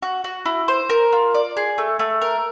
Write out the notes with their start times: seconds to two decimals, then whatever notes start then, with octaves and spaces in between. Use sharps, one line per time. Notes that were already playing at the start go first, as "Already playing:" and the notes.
0.02 F#4
0.24 F#4
0.46 E4
0.68 C5
0.90 A#4
1.12 F4
1.34 D5
1.57 G#4
1.78 A3
1.99 A3
2.21 A#4